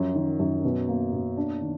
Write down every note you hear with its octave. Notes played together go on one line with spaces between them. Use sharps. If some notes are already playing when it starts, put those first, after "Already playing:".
Already playing: F#2 F3
D#3
F#2
B2
A#3
B2
D4
D#3